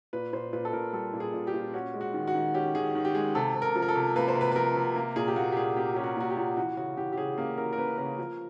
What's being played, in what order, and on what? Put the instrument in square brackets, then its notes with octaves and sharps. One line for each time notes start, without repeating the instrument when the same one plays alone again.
[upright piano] A#2 B4
A#2 C5
A#2 B4
A4
A#2 A#4
G3 A4
A#2
G#4
A#2
G4
A#2
C#4 F#4
G#3
F#4
D#3
F#4
D#3
C#4 G4
D#3 G#4
D#3
G4
G#3 G#4
C3 A4
C3
A#4
F3
A#4
A4
C3
A#3 B4
C5
C3
B4
B4
F3 A#4
C3
A#3
A#2 G#4
G4
A#3 F#4
G4
A#2 G#4
A#3 G4
C#4 G4
F#4
A#2 F#4
G4
A#2
E3 F#4
C#3 F#4
E3 G4
G4
C#3 G#4
A#3 G#4
E3 A#4
A#4
A#3 B4
C#3 A#4
F3